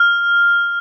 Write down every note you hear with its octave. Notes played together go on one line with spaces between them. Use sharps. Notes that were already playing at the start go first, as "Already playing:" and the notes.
Already playing: F6